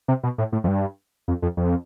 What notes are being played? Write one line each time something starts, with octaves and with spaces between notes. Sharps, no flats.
C3
B2
A2
A2
F2
G2
F2
F2
F2